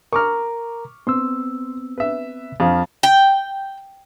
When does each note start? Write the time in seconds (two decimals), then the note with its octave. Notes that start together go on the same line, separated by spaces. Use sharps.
0.13 A#4 A#5 C#6 D6 F6
1.07 B3 C4 C6 E6
1.98 B4 E5
2.60 F2 F3
3.03 G5